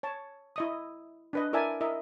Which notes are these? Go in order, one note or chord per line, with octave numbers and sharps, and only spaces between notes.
C#5 A5
E4 D#5 D#6
D4 B4 D#5
E4 A#4 D5 E5 G#5 A5
E4 A#4 D#5 E5